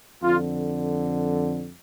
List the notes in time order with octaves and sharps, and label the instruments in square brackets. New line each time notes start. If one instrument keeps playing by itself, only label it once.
[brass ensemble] F2 D3 F4